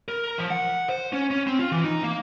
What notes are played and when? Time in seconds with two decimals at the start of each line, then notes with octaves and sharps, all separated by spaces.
0.08 A#4
0.38 F3
0.50 F#5
0.89 C5
1.13 C#4
1.31 C#4
1.47 C4
1.59 F4
1.72 E3
1.84 D#4
2.04 A#3